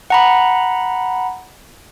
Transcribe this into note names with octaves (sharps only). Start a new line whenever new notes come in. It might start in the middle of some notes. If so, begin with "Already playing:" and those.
F#5 A#5 B5